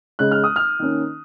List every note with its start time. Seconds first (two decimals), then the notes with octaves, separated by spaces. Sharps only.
0.19 C#3 G#3 C#4 F#6
0.31 F6
0.44 D#6
0.56 F6
0.79 D#3 A#3 C#4